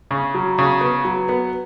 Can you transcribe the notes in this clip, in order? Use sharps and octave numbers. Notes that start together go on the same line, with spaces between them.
C#3
F#3
C#3
B3
F#3
B3